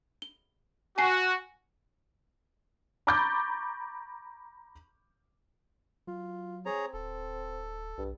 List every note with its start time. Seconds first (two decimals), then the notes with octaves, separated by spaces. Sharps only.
0.22 G7
0.98 F#4 G#5 A5 C7
3.07 A#5 B5 C#6 D6 G6 A6
6.07 F#3 F4
6.66 C4 G#4 C#5 A#5
6.93 D1 A4
7.98 B1 G2